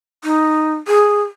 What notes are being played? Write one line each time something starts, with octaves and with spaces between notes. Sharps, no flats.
D#4
G#4